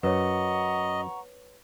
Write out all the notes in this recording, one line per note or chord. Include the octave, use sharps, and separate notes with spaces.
F#2 B4 C#5 D#5 F#5 A#5 C#6